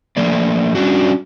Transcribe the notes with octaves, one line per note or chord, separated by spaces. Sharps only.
F3 A3 A#3 D5
G3 C#4 D4 F#4